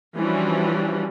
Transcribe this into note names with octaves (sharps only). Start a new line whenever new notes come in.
E3 F3 G3 C#4 D4 F#4